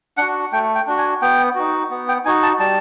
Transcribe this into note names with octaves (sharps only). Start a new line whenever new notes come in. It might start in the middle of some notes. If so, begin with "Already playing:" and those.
D4 F#4 F#5
A3 G5
G5
D4 F#4
G#5
B3 G5
D#4 F#4
B3
G5
D#4 F#4 G#5
A5
G3 A5